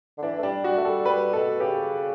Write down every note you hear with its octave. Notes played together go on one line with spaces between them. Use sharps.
D3
E3 D4
A3
G3 D4
G3 F#4
A3
G3 A4
G3 B4
B2 A4
C#3 G4